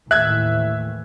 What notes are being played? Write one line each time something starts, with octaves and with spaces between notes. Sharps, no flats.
D#2 A2 E3 E5 F#6 G#6